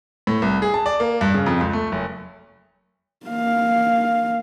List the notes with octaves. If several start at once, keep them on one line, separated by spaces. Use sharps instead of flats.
A2
C2
G#4
A5
D5
A#3
G2
C#3
F2
C#2
A3
F#1
A#3 F5